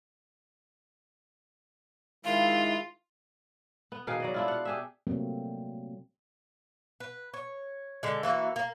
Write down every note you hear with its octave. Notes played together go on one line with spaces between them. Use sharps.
D#3 G#3 E4 F4 F5
B3
B2 D#3 G#4 F5
F#3 D5 D#5
D4 E4 F4
F5 F#5
G4 G#4 E5
C3 F#3 G3 A3 A#3 C4
B4
C#5
D3 G#3
E3 A#3 F#4
A#3